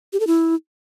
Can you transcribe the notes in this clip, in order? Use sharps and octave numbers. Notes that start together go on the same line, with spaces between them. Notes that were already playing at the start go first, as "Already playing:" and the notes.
G4
A4
E4